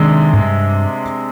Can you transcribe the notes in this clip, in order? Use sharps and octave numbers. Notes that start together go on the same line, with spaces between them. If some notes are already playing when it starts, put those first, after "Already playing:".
Already playing: C3 D#3 G#3 D4
G#2
G2